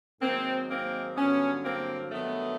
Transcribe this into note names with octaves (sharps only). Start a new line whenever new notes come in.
G#2 D#3 F#3 A#3 C4
A#3 C4
G2 D3 F#3 B3 C#4
A#3 C4
G2 D#3 F#3 A3 B3